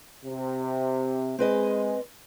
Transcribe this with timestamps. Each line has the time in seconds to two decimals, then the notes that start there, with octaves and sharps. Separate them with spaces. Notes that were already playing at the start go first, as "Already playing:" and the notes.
0.23 C3
1.39 G#3 C4 B4 D#5